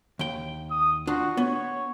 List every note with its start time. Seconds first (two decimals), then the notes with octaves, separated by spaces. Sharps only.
0.19 D#2 G5
0.71 D#6
1.07 D4 F4 F#4
1.37 B3 C#5